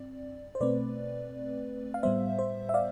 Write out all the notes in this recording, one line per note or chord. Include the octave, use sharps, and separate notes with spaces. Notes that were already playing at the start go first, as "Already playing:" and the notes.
Already playing: G2 C4 D5
C5
B2 A3 C4 B4 D5
F5
A2 G3 B3 C5 E5
C5
E5
D5 F5